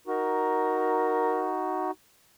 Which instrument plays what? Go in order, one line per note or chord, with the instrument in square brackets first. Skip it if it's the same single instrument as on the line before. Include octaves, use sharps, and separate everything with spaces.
[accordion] D#4 F#4 [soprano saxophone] A#4